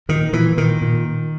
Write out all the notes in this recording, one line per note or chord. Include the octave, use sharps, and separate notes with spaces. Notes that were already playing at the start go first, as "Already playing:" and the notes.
A#2 D#3
A#2 E3
A#2 D#3
A#2